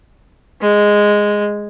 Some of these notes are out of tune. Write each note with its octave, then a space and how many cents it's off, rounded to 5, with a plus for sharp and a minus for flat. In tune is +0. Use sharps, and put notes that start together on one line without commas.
G#3 -5